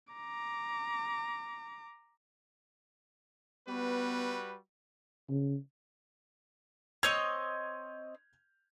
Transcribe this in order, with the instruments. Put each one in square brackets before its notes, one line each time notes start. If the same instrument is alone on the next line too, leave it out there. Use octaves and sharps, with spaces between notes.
[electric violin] A#5 D6
[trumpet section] G3 F#4 B4 [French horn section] B3
[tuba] C#3
[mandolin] C4 C#5 D#5 [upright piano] G6 G#6 F7